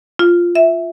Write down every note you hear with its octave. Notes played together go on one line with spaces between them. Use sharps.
F4
E5